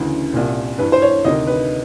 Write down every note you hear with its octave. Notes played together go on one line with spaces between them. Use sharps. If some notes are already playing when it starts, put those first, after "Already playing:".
Already playing: D2 C#3 E3
C2 A#2
G2 E3 B4
C5
C#5
D2 C3 D#3 D#5
B4